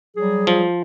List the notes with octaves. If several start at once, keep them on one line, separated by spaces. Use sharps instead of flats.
F#3 G3 G#4
F3